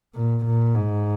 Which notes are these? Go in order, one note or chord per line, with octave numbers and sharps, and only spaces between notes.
A#2
A#2
G#2